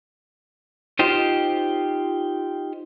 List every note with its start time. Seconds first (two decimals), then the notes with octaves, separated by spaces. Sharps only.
0.99 D#4 F4 G4 C5 D#5